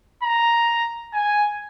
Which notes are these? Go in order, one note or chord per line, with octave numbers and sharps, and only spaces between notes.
A#5
G#5